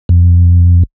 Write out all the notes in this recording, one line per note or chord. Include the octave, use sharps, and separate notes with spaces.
F2